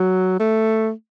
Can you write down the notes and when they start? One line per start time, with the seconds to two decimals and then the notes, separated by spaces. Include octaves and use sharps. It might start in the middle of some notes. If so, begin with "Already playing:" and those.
Already playing: F#3
0.39 A3